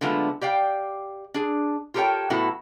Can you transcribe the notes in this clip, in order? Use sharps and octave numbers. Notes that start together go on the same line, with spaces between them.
D3 F#3 G#3 A3 B3 F4
G4 D5 F5 G5
D4 G#4
F4 G4 A4 A#4 C#5 G5
A2 F#3 B3 E4 F#4 A4